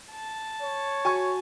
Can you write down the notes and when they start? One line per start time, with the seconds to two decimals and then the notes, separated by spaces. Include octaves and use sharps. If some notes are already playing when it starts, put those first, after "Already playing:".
0.11 A5
0.63 C#5
1.05 F#4 G#5 C#6